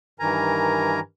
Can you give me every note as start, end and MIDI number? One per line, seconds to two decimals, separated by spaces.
0.20 1.00 43
0.20 1.00 51
0.20 1.00 52
0.20 1.00 70
0.20 1.00 80
0.20 1.00 82